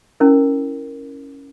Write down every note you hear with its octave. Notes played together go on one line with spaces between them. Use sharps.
C#4 E4 A#4